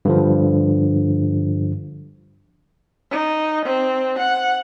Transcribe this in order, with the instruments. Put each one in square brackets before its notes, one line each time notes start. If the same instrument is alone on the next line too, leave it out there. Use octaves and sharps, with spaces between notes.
[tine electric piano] G2 D3 F3
[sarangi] D#4
C4
F#5